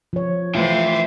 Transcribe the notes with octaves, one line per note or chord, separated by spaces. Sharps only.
F3 C#5
E3 A3 F4 C5 E5 G5